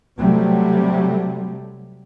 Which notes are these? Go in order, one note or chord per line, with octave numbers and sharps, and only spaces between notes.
C3 F#3 G3 A3